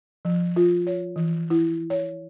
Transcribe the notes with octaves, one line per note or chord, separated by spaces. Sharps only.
F3
F4
C#5
E3
E4
C#5